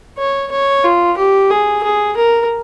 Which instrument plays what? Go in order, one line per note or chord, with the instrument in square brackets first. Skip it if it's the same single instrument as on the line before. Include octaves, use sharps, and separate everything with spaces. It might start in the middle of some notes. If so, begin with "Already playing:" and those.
[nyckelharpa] C#5
C#5
F4
G4
G#4
G#4
A#4